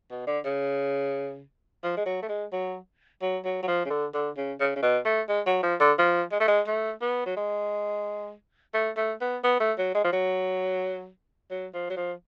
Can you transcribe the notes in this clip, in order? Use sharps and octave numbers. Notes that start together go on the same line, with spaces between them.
B2
D3
C#3
F3
G#3
F#3
A3
G#3
F#3
F#3
F#3
F#3
F3
C#3
D3
D3
C#3
C#3
C#3
B2
A3
G#3
F#3
F3
D3
F3
G#3
A3
G#3
A3
B3
F#3
G#3
A3
A3
B3
B3
A3
F#3
G#3
F3
F#3
F#3
F3
F#3
F3